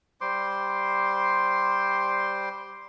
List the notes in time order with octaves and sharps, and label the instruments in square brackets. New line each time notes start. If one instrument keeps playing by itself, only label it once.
[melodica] G3 C5 C6 D6